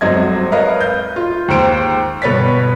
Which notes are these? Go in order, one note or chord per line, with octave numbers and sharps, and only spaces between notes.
D#1 G#1 F#3 C4 D#5 G#6
A#4 B4 C#5 D#5 F5
G6
F4
D#2 G#2 C5 D7
G1 B2 B4 C#5 A6 B6